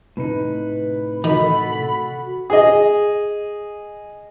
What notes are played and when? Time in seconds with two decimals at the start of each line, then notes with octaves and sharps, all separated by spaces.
0.17 A2 C3 D#4 B4
1.24 D#3 F#4 A4 B5
2.50 G#4 D#5